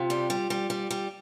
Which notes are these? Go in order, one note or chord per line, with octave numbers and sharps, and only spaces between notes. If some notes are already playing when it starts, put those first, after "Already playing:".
Already playing: C3 F4
G3
G3
G3
G3
G3